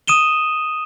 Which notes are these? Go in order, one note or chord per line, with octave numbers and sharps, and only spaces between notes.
D#6 D#7 E7 G7